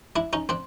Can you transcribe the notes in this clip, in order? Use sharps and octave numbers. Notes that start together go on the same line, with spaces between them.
D4 E4
C#4 D#4
C4 D4